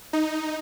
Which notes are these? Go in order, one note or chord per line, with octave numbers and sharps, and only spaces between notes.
D#4